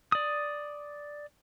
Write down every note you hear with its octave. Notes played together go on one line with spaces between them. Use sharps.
D5 D#6